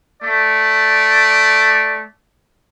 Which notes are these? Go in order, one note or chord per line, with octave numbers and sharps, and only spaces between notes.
A3 D5